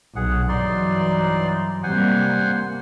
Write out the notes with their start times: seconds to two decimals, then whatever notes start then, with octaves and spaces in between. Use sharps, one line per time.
0.16 B1 G#4 F#5
0.49 G2 E3 F#3 D#4 D5 C6
1.83 C3 G3 A#3 C5 F#5 G#5
2.40 A#3